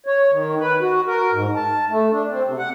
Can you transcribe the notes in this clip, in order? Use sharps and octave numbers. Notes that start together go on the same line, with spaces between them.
C#5
D#3
B4
F#4
A#4
G#2
A5
A3
D4
C4
C3
F#5